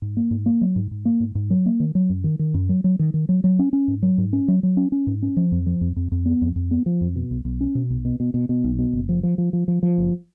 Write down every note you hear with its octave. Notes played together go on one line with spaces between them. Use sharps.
G#2
A#3
G#2
A#3
F#3
G#2
G#2
A#3
G#2
G#2
F#3
A#3
D#3
F#3
F#2
D#3
D#3
F#2
F#3
F#3
D#3
D#3
F#3
F#3
C#4
C#4
G#2
F#3
G#2
C#4
F#3
F#3
C#4
C#4
G#2
C#4
F3
F2
F3
F2
F2
F2
B3
F2
F2
B3
F3
F2
B2
B1
B1
C#4
B2
B1
B2
B2
B2
B2
B1
B2
F#1
F3
F3
F3
F3
F3
F3
F#1